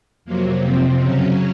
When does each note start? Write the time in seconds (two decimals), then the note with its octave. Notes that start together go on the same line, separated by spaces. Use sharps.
0.25 F2 C3 F#3 A#3
0.62 F2 C3 F3 C4
1.00 F#2 C#3 F#3 C#4